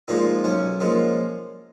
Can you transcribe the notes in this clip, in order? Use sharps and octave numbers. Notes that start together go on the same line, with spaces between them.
A#2 F3 G#3 D#4
B1 C#4
A#2 F3 G#3